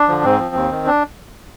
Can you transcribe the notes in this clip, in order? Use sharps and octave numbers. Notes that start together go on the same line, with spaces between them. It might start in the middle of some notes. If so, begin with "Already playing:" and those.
Already playing: D4
D3 F3
G#2 C4
F3
D#2
D#3
D4